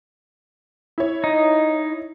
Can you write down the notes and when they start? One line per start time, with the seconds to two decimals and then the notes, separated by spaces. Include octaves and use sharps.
0.98 E4 C#5
1.24 D#4